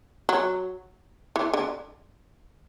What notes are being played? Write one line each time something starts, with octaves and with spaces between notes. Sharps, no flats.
F#3
E3
D3